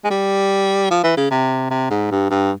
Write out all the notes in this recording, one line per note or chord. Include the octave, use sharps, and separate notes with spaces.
G#3
G3
F3
E3
C#3
C3
C3
G#2
G2
G2